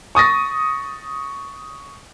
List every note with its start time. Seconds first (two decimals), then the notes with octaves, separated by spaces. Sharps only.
0.15 C#6 D#6 A6 A#6